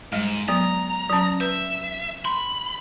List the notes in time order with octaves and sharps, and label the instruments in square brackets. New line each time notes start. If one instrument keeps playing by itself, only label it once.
[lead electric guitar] G#2 [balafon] G3 G#3
[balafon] F#3 B3 [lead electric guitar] A#5
[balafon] F#3 C#4
[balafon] B4 [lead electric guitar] E5
[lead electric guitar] B5 [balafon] C6